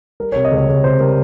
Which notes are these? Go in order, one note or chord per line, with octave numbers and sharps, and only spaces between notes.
G3 A#4
C3 C#5
D#5
C#2 C#5
C#2 C#5
C3 C5
G3 A#4